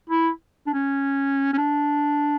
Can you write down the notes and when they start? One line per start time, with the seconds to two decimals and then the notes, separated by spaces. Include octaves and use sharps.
0.09 E4
0.67 D4
0.74 C#4
1.53 C#4
1.57 D4